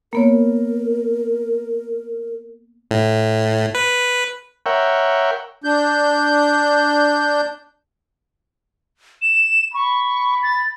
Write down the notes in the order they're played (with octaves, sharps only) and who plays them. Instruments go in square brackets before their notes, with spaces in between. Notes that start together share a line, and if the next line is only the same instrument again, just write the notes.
[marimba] A#3 B3 C#5 [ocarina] A#4
[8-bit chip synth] A2
B4
[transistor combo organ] A#4 C#5 E5 F#5 G5
[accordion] D4 G6
[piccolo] E7
[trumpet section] B5 [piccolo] C#6
[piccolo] A6